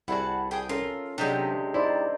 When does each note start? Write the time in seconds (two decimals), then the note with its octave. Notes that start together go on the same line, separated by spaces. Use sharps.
0.08 C2 E4 F#4 G#4 F#5 A5
0.51 G#4 G5 G#5 D#6
0.69 C#4 F4 A4 A#4
1.18 C3 F#3 G#3 D4 D#4 G4 A4
1.74 D#4 E4 C5 D5